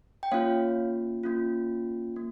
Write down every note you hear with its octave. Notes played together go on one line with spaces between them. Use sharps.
G5
A#3 C#4 F4 C#5 F5
A#3 C#4 F4
A#3